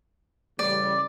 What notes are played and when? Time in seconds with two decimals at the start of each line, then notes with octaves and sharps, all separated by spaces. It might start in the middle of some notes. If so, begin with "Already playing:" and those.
0.59 A1 C#3 G3 D5